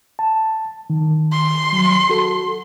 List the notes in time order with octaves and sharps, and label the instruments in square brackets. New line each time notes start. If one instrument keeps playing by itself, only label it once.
[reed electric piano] A5
D#3
[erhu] C6
[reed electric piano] F#3
F#4 A4